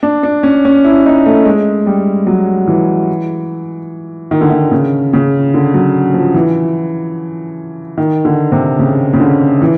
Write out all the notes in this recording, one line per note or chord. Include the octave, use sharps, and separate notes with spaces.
D4
D4
C#4
C#4
E4
D#4
A3
G#3
G3
F#3
E3
D#3
D3
D#3
C#3
C#3
D3
F#3
F3
E3
D#3
D3
C3
C#3
C#3
D3
E3